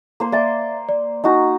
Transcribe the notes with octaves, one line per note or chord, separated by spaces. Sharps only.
A#3 C5
A#3 D5 E5 C6 D6 A6
D5
D#4 F#4 D#5 G#5